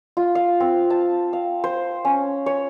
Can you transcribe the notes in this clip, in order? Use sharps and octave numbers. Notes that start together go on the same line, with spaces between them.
F4
F5
C4
A5
F5
C5
C#4
C#5